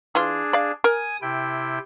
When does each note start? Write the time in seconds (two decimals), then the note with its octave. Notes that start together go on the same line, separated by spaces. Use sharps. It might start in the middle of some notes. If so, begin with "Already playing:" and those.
0.15 E3 D4 F4 G#4
0.53 D5 F5
0.84 A#4 G#5 D#6
1.21 C3 E4 G5